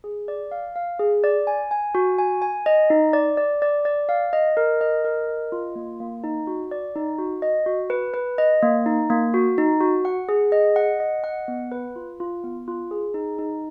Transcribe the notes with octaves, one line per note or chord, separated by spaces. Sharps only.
G#4
D5
F5
F5
G#4
D5
G#5
G#5
F#4
G#5
G#5
D#5
D#4
D5
D5
D5
D5
F5
D#5
A#4
D#5
A#4
D#5
F4
A#3
A#3
D#4
F#4
D5
D#4
F#4
D#5
F#4
B4
B4
D#5
A#3
D#4
A#3
F#4
D#4
F#4
F#5
G#4
D#5
F#5
D#5
F#5
B3
B4
F4
F4
B3
F4
G#4
D#4
D#4